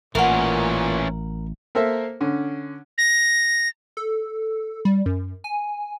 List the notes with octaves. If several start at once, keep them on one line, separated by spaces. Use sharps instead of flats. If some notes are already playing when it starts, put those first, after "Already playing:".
A1 A#2 E3 C#4 A#4 F#5
A#3 A4 A#4 C5 E5
D3 C#4
A#6
A4
G3
F#2
G#5